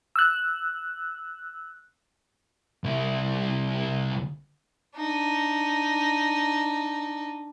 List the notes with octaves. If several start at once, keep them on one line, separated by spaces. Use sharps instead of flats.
E6 F#6
C2 E4
D4 D#4